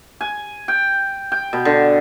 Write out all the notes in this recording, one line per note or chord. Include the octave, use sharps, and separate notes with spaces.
G#5
G5
G5
B2
D3